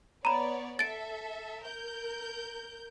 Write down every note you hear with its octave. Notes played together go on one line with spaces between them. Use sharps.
B3 C#5 D5 A#5 B5
A4 E5 A6 D7
A#4 G6